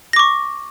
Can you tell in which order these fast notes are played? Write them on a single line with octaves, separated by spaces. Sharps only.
A#6 D6 C#6